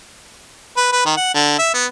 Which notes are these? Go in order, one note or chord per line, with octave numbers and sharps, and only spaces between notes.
B4
B4
D#3
F#5
D3
E5
B3